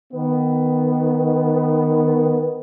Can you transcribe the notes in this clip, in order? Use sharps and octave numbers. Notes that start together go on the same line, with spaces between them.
D#3 B3